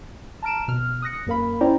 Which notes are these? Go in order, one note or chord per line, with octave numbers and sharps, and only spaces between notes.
A5 A#5 F6 D7 E7
B2 F6
D#6 F#6 A#6 C#7
F#2 A#3 A#4 F5 B5
C#4 E4 C5 D5 G5 A#5